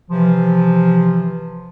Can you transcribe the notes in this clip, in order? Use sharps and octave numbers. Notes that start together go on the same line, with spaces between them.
C3 E3 F3